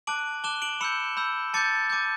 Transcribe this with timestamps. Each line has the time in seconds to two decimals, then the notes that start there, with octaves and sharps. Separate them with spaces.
0.07 A5 D6 F#6 D7 F#7
0.44 A5 D6 F#6 E7 G7
0.62 D7 F#7
0.81 B5 E6 G6 C#7 E7
1.17 B5 E6 G6
1.54 A5 D6 G6 A6 C#7
1.90 A5 D6 G6